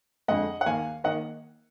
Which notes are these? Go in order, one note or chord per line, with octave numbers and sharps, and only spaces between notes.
F2 D3 G#3 D#5 F#5
F#5
D#2 D#3 A#3 F5 G#5
D#3 A#3 D#5 F#5